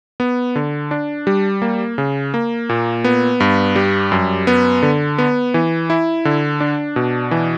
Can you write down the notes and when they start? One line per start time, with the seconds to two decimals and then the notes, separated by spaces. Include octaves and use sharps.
0.20 B3
0.56 D3
0.91 D4
1.27 G3
1.62 A#3
1.98 C#3
2.34 A#3
2.69 A#2
3.04 B3
3.40 G2
3.76 G3
4.12 F#2
4.47 B3
4.82 D3
5.18 B3
5.54 E3
5.90 E4
6.25 D3
6.60 D4
6.96 B2
7.31 E3